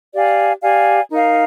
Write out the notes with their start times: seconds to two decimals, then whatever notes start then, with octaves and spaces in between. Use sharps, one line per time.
0.14 G4 D5 F5 G#5
0.62 G4 D5 F5 G#5
1.10 D#4 A#4 F5